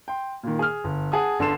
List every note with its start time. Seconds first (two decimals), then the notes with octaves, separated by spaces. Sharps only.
0.08 G5 C6
0.43 A#2 D#3
0.59 G#4 F6
0.84 G1
1.12 G#4 F#5 A5 D#6
1.39 G1 D3 A5 C6 C7 E7